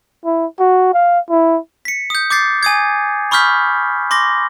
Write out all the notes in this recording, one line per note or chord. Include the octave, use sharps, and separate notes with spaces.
E4
F#4
F5
E4
B6 C#7
D#6 G6
D6 G6 A6 C7
G#5 D#6 G#6
B5 C#6 D#6 F6 G6 B6
C6 D6 A#6